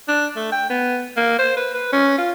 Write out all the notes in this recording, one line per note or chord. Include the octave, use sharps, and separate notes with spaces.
D4
A3
G5
B3
A#3
C5
B4
B4
C#4
F4